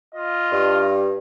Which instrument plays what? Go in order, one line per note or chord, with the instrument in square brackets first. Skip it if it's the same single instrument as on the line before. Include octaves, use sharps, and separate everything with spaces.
[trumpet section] F4 D#5
[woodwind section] G2